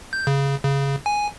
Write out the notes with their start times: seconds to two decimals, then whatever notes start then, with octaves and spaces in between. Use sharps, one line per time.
0.13 G6
0.27 C#3
0.65 C#3
1.06 G#5